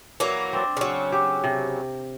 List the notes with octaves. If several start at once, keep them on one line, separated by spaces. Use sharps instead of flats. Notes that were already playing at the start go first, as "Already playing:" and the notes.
E3 F#3 A#3
C4 D4
C#3 F#3
G4
C3